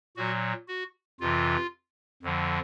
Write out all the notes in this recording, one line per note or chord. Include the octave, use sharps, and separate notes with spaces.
A#2 F#3 F#4
F#4
F2 C3 E3 F4
F2 D3 F3